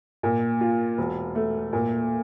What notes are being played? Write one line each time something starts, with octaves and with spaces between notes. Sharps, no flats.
A#2
F4
E1
A3
A#2